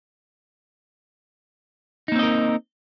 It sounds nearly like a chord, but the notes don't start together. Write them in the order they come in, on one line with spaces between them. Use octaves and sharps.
D#4 A#3 C4 D#5 A#4